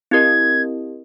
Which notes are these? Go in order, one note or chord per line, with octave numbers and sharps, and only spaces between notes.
C4 E4 G4 A#4 D#5 G#6